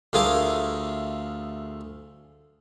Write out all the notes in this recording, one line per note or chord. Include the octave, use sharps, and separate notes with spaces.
D2 A3 F4 G#4 A#4 D6